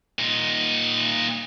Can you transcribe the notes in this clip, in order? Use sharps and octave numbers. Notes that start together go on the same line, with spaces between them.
A#2 D#4